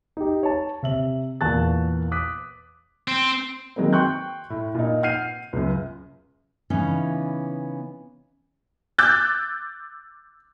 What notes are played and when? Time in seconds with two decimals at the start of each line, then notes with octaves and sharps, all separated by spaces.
0.17 D#4 G4
0.43 C#5 A5
0.83 C3 E5 F#7
1.41 E2 A#2 A5 C#6 F#6 A6
2.12 D6 D#6 F#6 B6
3.08 C4
3.76 D#3 F#3 G#3 A#3 C4
3.93 G5 C6 C#6 F#6 G6
4.50 A2
4.75 A#2 D#4
5.03 F#5 F6 G6 C7 D#7
5.53 C#2 F#2
6.70 C#3 E3 B3 C#4 D#4
8.98 D6 E6 F#6 G6 A6